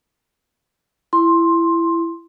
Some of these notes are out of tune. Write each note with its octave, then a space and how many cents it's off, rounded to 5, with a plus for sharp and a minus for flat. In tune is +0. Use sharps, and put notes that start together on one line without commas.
E4 +20 C6 +10